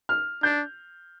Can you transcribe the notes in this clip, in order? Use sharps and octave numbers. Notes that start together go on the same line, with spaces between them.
F6
D4 G6